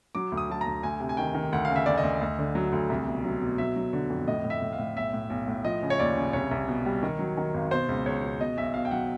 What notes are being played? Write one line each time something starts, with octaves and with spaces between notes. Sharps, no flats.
F#3 D6
D2
D#6
F#3 A5
A#5
D2
D2 G#5
C3
G#5
D#3 G5
D#3
D2 F#5
C#3 F5
E5
D2 D5
D#5
D2
D2
D3
F#3
D2
C2
B2
F#3
B2
F#3 E5
F#3
D3
F2
A2 D#5
A2
E5
A2
F5
A2
B1 E5
A2
B1
A2
F3 D#5
C#3
C#5
D#2 D5
C#3
C2 C#5
C2
B2
G3
D#3
F#3
D#3
G#1
B2 C5
C#2
C#2 C#5
B2
B2 D#5
B1 E5
B2 F5
G5
F#3 F#5